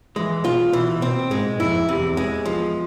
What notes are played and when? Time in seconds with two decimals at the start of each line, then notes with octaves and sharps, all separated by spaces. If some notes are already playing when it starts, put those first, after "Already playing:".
0.16 E3 G#3
0.45 B2 F4
0.73 B2 E3
1.02 B2 C4
1.31 G#2 G#3
1.60 F2 E4
1.89 E2 C3
2.17 G#3
2.46 F3